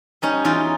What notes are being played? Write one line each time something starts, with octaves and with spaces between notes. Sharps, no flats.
G3 C#4 D#4
E2 D#4 F4